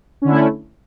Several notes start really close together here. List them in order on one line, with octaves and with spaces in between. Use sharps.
C#4 D3 E4 A3